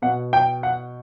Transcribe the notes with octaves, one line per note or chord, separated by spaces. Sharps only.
B2 F#5
G5
F#5